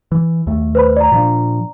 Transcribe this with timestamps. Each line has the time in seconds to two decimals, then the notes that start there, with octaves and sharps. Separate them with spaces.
0.12 E3
0.47 D#2 A3
0.75 B4 C5 B5
0.97 D5 A#5
1.12 A#2 F3 D4